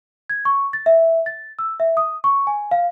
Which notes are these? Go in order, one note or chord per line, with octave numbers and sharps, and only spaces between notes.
G#6
C#6
A6
E5
A6
E6
E5
D#6
C#6
G#5
F5